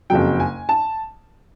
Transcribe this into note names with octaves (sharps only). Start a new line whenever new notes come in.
F#1 F2 C#3 F#3 G5
G#5
A5